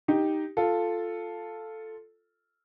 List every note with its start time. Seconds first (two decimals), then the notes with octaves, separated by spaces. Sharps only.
0.08 D#4 G4
0.57 F4 A4